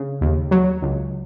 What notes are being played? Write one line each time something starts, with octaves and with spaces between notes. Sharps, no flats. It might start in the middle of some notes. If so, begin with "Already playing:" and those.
Already playing: C#3
D#2
F#3
C#2